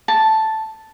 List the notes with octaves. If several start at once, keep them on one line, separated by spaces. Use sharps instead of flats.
A5